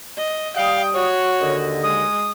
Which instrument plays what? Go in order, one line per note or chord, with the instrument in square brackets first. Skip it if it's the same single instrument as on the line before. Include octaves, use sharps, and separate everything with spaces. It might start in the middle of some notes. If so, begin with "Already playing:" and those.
[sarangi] D#5
[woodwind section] G3 D#6 [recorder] F5 [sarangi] G5
[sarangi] F#4 [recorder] C#5
[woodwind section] D#2 D3 D#5
[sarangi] G#3 [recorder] D#6